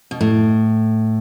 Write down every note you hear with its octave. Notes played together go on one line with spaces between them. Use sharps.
B2
A2